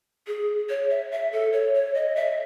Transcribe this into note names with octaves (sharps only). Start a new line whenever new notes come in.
G#4
C#5
E5
E5
A4
C#5
C#5
D#5
E5